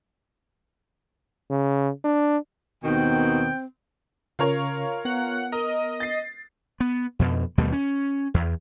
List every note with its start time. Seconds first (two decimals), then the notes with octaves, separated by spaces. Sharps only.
1.50 C#3
2.05 D4
2.84 D#2 B2 D#3 B3 C4 G5
4.39 C#3 C#4 F4 A#4 C#5 F5
5.05 B3 F#5
5.52 A#4 D#5
6.00 A6 C7
6.80 B3
7.19 F2 B2
7.58 D#2 B2 G3 A3
7.72 C#4
8.34 E2